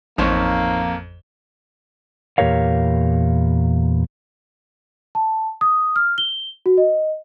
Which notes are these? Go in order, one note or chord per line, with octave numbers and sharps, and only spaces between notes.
A1 F2 A#3 D#4 C5 C#5
E2 A#2 G4 A#4 C#5 F5
A5
D#6
F6
G7
F#4
D#5